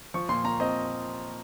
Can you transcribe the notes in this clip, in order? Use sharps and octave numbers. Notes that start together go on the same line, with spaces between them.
F3 C#6
A#2 C6
A#2 A#5
C4 D#5